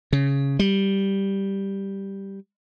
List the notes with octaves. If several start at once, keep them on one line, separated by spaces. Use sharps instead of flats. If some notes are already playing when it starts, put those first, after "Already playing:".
C#3
G3